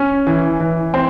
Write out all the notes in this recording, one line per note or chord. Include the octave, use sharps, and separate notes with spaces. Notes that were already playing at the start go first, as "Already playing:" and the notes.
Already playing: C#4
E3
E3
C4